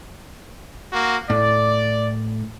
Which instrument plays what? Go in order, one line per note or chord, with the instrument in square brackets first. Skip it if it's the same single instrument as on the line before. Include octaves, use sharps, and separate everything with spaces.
[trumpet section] A#3 F#4
[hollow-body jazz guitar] A2 [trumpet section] D5